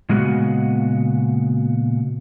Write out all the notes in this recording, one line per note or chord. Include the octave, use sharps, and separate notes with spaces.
A#2 C#3 G#3 B3 F#4